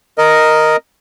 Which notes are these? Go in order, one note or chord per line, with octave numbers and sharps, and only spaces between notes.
A#4 D#5